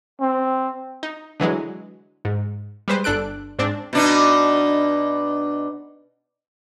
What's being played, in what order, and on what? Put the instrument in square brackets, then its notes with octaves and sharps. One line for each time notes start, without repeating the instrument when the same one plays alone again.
[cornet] C4
[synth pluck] D#4
D3 E3 F#3 G#3
G#2
G3 G#3 B4 C5
G1 D4 A4 F#6 D7
G#2 C4 D4
[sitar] B2 D4 D#4